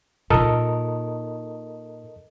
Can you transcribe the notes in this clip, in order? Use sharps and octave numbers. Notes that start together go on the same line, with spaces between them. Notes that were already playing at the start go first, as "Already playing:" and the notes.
A#2 D#4 A4 A#4 D#5